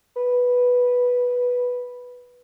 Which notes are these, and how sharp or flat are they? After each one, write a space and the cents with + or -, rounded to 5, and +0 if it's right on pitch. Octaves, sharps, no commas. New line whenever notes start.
B4 -5